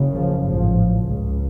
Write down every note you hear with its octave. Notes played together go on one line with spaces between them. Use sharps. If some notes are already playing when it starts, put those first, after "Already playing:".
Already playing: F#1 F#2 C#3
F3
A1 G#2 F3
C#2 C#3